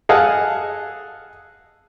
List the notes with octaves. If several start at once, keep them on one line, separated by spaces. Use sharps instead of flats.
G#4 A4 D#5 F5 F#5 G#5